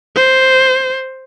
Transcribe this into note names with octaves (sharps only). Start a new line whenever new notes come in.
C5